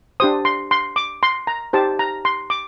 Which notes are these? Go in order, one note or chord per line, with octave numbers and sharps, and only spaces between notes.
D4 G4 C5 D#6
C6
C6
D6
C6
A#5
D#4 G4 C5 A5
A#5
C6
D6